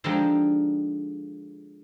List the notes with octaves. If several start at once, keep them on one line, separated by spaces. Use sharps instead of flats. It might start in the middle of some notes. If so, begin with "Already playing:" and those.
D3 F3 G#3 D4 D#4 G4